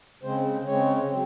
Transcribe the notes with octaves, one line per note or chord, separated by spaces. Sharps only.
C#3 G#3 C4 C5
C#3 G#3 C4 C#5
F#3 C4